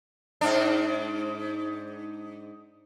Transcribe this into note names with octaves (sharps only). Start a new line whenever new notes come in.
G#2 D4